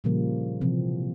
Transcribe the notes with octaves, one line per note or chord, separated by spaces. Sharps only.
A#2 C#3 F3 G3 A#3
C3 E3 F3 C4